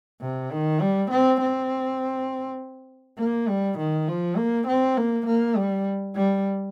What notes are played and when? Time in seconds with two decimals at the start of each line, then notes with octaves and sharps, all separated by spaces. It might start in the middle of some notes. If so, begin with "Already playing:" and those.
0.22 C3
0.51 D#3
0.81 G3
1.11 C4
1.41 C4
3.19 A#3
3.48 G3
3.78 D#3
4.08 F3
4.37 A#3
4.67 C4
4.97 A#3
5.27 A#3
5.56 G3
6.16 G3